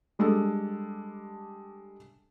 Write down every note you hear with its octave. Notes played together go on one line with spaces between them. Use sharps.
G3 G#3 D4 A4